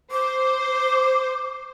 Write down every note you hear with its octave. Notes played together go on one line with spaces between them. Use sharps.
C5 D6